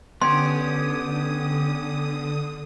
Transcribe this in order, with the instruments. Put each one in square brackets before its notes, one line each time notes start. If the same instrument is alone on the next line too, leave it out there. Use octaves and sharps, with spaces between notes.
[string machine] D3 D#6 [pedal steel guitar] B3 C#4 G4 [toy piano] C6